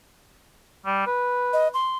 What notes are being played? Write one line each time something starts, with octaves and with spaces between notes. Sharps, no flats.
G3
B4
D#5
C6